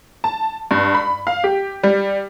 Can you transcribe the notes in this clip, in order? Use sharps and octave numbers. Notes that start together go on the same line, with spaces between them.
A5
G2
B5
F5
G4
G3